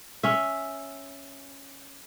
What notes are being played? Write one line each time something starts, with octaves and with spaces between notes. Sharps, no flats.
C#4 E5